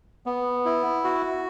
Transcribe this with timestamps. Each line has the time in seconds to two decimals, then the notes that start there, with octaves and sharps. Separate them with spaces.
0.26 B3
0.65 E4
1.04 F#4